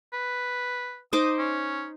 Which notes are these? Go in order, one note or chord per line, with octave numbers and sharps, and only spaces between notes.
B4
D#4 C5 D6 D#6
C#4